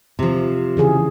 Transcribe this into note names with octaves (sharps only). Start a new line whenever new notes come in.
C3 F3
C#3 E3 G#4